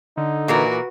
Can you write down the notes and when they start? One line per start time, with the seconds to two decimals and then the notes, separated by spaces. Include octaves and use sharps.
0.17 D3 D#4
0.48 A#2 E3 F#4 A#4 B4